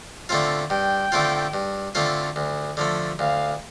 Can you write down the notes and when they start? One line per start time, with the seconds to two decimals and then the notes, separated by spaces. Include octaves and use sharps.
0.29 D3 A3 C4 F4
0.70 G2 G5
1.12 D3 A3 C4 F4
1.54 G2
1.95 D3 A3 C4 F4
2.36 D2
2.77 D3 F3 A3
3.19 D2 F5